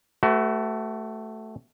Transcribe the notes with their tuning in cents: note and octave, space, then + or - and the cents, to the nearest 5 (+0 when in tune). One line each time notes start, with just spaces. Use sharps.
A3 +0 F#4 +30 B4 +40